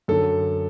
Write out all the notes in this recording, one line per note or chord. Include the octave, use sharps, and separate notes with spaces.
F#2 D3 A4